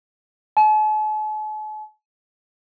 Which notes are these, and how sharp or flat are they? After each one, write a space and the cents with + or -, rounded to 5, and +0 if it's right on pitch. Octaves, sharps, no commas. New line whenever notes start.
A5 -45